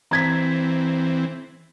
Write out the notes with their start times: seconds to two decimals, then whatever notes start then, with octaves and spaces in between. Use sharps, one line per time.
0.11 E3 C4 A#5 G#6 B6